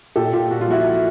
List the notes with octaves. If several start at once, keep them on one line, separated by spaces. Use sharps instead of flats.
A#2 G4 A4
A#2 F4 G4
A#2 F#4
F4
F3 E4 F#4